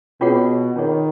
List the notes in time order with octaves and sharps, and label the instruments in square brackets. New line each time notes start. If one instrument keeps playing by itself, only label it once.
[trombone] B2 [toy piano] C#4 F4 G#4 C#5 F#5
[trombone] D#3 [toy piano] C#4 F4 G#4 C#5 F#5